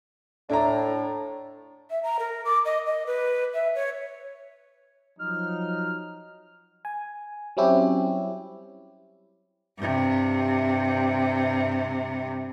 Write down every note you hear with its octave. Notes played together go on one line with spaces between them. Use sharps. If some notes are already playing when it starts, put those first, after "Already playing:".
A2 D4 A#5
E5
A#5
A#4
D6
D#5
D#5
B4
E5
C#5
F3 F#3 D#4 F6
G#5
F#3 G3 C4 C#4 E4 G4
G2 C3